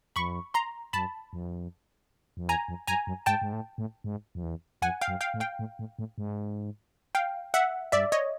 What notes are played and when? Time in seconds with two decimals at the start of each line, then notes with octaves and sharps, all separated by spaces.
0.16 F2 B5 C#6
0.54 A#5 C6
0.93 F#2 A5 B5
1.33 F2
2.37 F2
2.49 E2 G#5 A#5
2.68 F2
2.87 F#2 G#5 A#5
3.07 F#2
3.26 G#2 G5 A5
3.42 G#2
3.53 A2
3.78 A2
4.04 G#2
4.35 F2
4.43 E2
4.82 F2 F#5 G#5
5.02 F5 G5
5.08 F#2
5.21 F5 G5
5.34 A2
5.40 F5 G5
5.59 A2
5.79 A2
5.99 A2
6.18 G#2
7.15 F5 G5
7.54 E5 F#5
7.92 G2 D5 E5
8.12 C#5 D#5